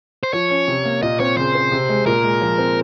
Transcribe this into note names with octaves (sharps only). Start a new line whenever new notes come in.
C5
F3 C#5
C#4
C3
A#3
A#2 D#5
C4 C#5
C#3 C5
C4
C3
G#3
A#2 A#4
G#3
F3
C4